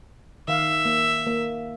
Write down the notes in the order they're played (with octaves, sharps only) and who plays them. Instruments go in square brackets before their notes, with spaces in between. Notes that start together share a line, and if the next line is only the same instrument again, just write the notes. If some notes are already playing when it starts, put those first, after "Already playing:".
[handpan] D#3 F5 [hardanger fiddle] E5
[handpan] A#3
A#3